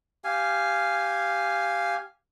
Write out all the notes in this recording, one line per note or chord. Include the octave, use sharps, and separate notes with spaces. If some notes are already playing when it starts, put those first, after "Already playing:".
G4 F5 G#5